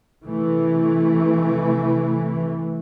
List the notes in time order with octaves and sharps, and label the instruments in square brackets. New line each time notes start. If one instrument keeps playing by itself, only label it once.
[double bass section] C3 E3 A3